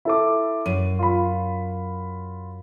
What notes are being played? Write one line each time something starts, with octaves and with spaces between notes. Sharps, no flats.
E4 A4 D6
F#2 D#7
F4 B5